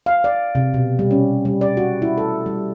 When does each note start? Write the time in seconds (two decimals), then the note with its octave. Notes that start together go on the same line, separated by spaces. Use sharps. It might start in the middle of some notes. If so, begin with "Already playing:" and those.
0.06 F5
0.24 D5
0.55 C3
0.74 B2
0.99 G3
1.11 C#4
1.45 G3
1.61 D5
1.77 F#4
2.02 E4
2.18 A4
2.46 G3